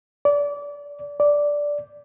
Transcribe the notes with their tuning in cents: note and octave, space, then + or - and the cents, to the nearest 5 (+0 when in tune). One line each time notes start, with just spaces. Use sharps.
D5 -25
D5 -5